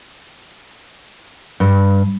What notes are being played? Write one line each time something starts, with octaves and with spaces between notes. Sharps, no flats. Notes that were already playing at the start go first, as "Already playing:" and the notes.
G2